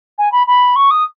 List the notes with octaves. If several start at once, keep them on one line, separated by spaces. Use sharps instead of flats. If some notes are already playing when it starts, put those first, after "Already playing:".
G#5
B5
B5
C#6
D#6